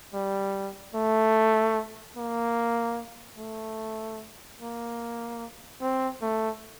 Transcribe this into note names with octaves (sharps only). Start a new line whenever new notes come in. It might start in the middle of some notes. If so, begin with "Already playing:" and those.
G3
A3
A#3
A3
A#3
C4
A3